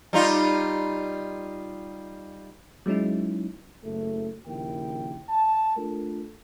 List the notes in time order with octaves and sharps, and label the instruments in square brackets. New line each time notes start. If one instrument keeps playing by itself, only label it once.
[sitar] G3 D#4 F4
[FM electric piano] F#3 G#3 C#4 D#4 E4
[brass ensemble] F#1 A3
A#1 D#2 C#3 E4 A#4 G5
A5
A3 D4 F4 A4 A#4